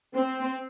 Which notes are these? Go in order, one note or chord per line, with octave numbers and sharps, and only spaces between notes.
C4